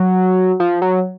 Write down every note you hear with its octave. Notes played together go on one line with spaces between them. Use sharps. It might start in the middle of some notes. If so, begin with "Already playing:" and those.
Already playing: F#3
F3
F#3